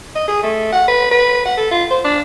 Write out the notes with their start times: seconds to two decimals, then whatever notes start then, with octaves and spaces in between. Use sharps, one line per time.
0.15 D#5
0.28 G#4
0.43 A3
0.72 F#5
0.88 B4
1.11 B4
1.45 F#5
1.57 A4
1.71 F4
1.91 C5
2.04 D4